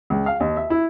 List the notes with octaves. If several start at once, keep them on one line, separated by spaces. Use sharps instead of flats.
C#2
F5
D#2
E5
E4